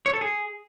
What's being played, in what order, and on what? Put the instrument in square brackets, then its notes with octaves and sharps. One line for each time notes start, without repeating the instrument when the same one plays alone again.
[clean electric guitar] C#5
A4
G#4